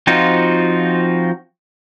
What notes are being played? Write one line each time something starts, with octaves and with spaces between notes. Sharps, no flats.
F3 C4 D#4 F4 F#4